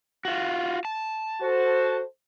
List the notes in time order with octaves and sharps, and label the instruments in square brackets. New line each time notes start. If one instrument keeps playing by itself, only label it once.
[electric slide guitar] F4 F#4
A5
[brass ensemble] F#4 A4 C5